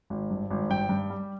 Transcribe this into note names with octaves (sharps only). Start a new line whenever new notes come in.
G#1
G2
G#1
G2 G5
G2
G3